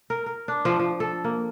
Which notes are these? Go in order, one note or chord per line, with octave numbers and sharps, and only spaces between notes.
A#4
A#4
D4
F3
F3
A4
A#3